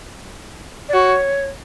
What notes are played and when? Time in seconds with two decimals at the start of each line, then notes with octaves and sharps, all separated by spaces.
0.89 D5
0.93 F#4 C#5